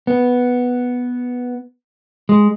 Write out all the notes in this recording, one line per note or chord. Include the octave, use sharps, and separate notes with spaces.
B3
G#3